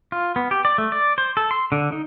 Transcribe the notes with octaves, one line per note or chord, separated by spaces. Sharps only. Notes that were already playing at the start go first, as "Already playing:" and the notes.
F4
B3
G4
D5
A3
D5
C5
A4
C6
D3
D#4